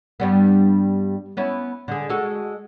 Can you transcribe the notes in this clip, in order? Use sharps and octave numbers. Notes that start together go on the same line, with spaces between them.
G2 G3 B3
B3 C#4 E4
D3 G#4
G#3 F#4 A4